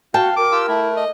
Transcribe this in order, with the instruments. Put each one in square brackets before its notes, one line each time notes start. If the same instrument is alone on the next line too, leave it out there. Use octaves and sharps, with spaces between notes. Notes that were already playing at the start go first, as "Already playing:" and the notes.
[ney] F#4 [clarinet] F5 [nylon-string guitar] G5 A5
[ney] A#4 [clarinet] D6
[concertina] F4 G4 E6
[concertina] A3 [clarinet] E4
[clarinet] D#5